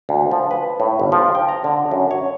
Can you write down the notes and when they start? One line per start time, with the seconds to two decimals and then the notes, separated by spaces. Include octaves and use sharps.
0.09 D2
0.31 F3
0.51 B4
0.80 A2
0.99 G1
1.12 F3
1.35 G5
1.49 A#5
1.64 D3
1.91 F#2
2.11 C#5